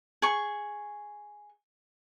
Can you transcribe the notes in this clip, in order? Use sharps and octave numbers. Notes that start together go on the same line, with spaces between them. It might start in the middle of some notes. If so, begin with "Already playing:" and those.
G#4 C#6